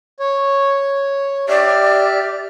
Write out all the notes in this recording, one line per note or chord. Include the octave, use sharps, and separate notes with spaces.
C#5
G4 D5 E5 F6